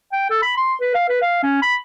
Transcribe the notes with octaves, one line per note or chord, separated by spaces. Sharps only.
G5
A4
B5
C6
B4
F5
B4
F5
C#4
B5